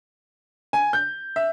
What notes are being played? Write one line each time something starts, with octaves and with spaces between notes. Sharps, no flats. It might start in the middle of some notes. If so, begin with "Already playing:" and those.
G#5
G6
E5